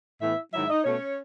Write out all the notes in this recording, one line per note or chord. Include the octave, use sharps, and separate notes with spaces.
A2 E3 B3 E4 E5
G#2 D#3 F#3 E4 E5
D#4 D#5
B2 A3 C#4 C#5